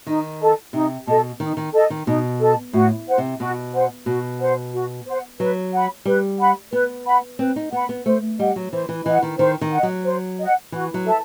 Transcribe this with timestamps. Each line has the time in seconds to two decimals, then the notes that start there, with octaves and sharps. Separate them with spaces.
0.07 D#3 D#4
0.40 A4 D#5 A5
0.73 C3 D#4
1.06 B2 A4 D#5 A5
1.40 D#3 D#4
1.57 D#3
1.73 A4 D#5 A5
1.90 D#3
2.06 B2 D#4
2.39 A4 D#5 A5
2.73 A2 F#4
3.07 C5 F#5
3.18 C3
3.40 B2 F#4
3.73 C5 F#5
4.06 B2 F#4
4.40 C5 F#5
4.73 F#4
5.06 C5 F#5
5.39 F#3 B4
5.73 F#5 B5
6.05 G3 B4
6.39 F#5 B5
6.72 B3 B4
7.06 F#5 B5
7.39 C4 B4
7.56 D#4
7.72 B3 F#5 B5
7.89 B3
8.06 A3 C5
8.39 G3 D#5 F#5
8.56 F#3
8.72 E3 C5
8.89 E3
9.05 E3 D#5 F#5
9.23 D#3
9.39 D#3 C5
9.61 D#3
9.72 D#5 F#5
9.83 F#3
10.05 C5
10.38 D#5 F#5
10.72 E3 F#4
10.94 F#3
11.05 A4 E5 A5